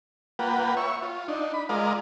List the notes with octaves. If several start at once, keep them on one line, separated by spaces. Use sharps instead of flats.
A#3 F4 B4 F#5 G5
C#5 E5 C#6
F4
D4 D#4
B5
G#3 F4 A#4 D5 D#5 F5